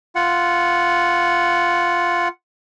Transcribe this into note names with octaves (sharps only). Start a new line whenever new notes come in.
F4 F#5